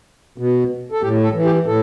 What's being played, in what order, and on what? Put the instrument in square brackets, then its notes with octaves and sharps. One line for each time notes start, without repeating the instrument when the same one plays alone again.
[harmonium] B2
A4
A2 G4
A4
E3
G4
A2 A4